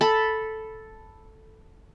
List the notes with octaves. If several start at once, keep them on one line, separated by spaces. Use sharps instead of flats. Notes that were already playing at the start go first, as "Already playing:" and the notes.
A4 B5